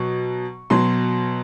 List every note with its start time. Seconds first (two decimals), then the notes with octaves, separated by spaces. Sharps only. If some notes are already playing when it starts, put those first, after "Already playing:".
Already playing: B2 F#3 C#6
0.70 B2 F#3 C6